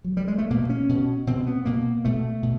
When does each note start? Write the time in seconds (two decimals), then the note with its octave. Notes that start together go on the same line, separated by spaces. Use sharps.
0.04 F#3
0.17 G3
0.28 G#3
0.38 A3
0.50 B2 A#3
0.69 C#4
0.89 B2
1.27 B2 C4
1.47 B3
1.65 B2 A#3
2.05 B2 A3
2.43 B2